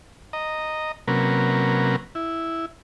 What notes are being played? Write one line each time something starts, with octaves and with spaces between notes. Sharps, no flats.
D#5 A#5
C3 F#3 A#3 C#4 A#4 B4
E4